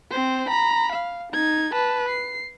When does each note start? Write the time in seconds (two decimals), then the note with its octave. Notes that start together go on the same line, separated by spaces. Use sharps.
0.11 C4 C5
0.49 A#5 B5
0.93 F5
1.33 D#4 G#6
1.74 B4 A5
2.09 C7